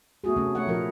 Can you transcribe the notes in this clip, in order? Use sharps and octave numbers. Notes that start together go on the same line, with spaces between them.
A3 B3 E4 F#4 G#4
C3 A3 C#4 E4
A3 D#4 C#5 F#5
A#2 F3 E4 A#4